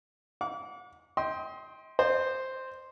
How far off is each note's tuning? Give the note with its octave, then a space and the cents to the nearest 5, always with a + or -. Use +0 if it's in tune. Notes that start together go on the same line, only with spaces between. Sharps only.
F#5 -40 D6 -35
D#5 +40 G5 +0 C6 +0
C5 +0 D#5 -45